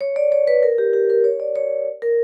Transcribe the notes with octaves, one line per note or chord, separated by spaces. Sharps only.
C#5
D5
C#5
B4
A#4
G4
G4
A#4
C#5
D5
C#5
A#4